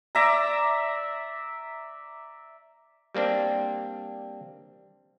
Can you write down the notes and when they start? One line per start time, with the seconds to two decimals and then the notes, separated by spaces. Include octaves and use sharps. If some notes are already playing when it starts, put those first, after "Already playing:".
0.15 D5 E5 A#5
3.15 G3 A#3 C4 D4